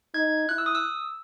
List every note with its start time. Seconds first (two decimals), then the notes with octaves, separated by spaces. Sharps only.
0.14 D#4 G#6
0.49 E4 F#6
0.58 E6
0.66 D#6
0.75 E6